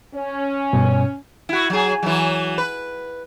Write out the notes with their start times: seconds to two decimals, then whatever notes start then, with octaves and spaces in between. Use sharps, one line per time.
0.15 C#4
0.73 G2 B2
1.49 E4 F#4
1.70 F#3 G#4
2.03 E3 F#3
2.58 B4